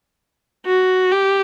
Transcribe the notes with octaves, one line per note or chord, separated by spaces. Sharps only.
F#4
G4